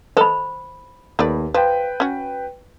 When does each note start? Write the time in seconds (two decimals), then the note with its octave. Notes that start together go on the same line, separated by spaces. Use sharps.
0.17 A4 C5 D#5 B5
1.19 D#2 A3 B4 D5
1.54 F3 B4 G5
2.00 C#4 F#4